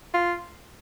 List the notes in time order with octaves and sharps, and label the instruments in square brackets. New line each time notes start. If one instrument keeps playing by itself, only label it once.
[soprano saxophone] F4